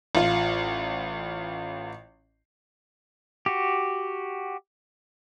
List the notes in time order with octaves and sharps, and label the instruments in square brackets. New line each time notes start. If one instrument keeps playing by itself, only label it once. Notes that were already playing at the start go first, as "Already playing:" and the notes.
[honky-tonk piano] A1 F4
[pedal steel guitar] F#4 G4